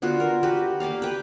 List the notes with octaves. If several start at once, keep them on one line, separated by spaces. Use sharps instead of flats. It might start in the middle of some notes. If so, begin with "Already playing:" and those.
D3 B3 F4 F#4
A#4
F#4 G4 B4
A#3 G4 D5 F5
B4 G5